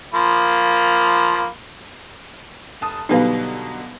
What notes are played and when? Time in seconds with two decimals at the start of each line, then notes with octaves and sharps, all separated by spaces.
0.14 F3 A#3 B5
2.81 F1 A5 D#6
3.09 B2 D3 F#3 G3 B3 D#4 B4 F5